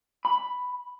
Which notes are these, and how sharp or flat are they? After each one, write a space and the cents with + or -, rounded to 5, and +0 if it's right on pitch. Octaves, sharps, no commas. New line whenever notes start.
B5 +5